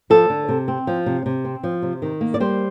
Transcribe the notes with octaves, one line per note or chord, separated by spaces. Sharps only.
F3 A4
D3
C3
C4
F3
C3
C3
C4
F3
C3
D#3
A#3
D5
G3 C5